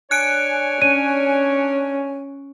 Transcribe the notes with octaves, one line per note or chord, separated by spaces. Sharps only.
D4 C#5 G#5 F#6 C#7 D7
C#4 D#7